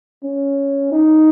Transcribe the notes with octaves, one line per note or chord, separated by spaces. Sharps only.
C#4
D#4